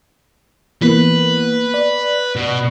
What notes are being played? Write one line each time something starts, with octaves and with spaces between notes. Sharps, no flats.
E3 A#3 B3 B4
D5
B2